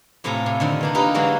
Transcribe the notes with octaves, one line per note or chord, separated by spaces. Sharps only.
A2 C3 A3 F4 G#5 A#5
C3
D3 D#3 F3
E3 A#3 D4
D#4 F4 G4 A#4 B4
D3 E3 F#3 G#3 A#3 F#4